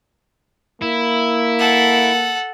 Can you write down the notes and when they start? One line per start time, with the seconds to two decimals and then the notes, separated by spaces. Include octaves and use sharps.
0.82 A#3 E4
1.59 A4 F#5